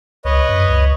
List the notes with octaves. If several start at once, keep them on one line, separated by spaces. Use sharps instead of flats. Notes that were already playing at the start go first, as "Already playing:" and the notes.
C#2 B4 C#5 D#5
F#2
C#2